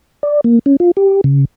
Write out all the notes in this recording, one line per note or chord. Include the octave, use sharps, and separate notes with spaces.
D5
A#3
C#4
F4
G4
C#3